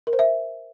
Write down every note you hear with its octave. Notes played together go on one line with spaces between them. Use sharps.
A#4
C5
E5